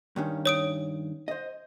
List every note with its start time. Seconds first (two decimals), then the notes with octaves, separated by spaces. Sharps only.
0.16 G2 D#3 C#4
0.46 C#5 D#6 D7
1.28 C5 D#5